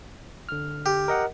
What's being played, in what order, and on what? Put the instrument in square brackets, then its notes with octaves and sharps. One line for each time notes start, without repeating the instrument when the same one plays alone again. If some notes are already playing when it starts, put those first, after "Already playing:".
[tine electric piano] D3 F6
[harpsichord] G4
[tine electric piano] A#4 D#5 F#5